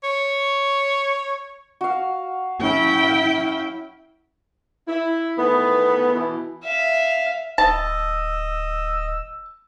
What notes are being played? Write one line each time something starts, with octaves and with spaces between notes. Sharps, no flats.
C#5
F#4 F5
C#4 E4 G5
F5
E4
D#3 E3 A3 B3
B2 E3
E5 F5
D1 D#5 A5 E6